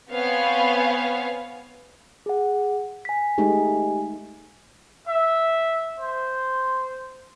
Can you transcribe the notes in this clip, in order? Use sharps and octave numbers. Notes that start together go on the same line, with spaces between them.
B3 C4 C#5 F5 G#5
G#4 F#5
G#5 B6
G#3 A3 D#4 G4 G#5
E5
C5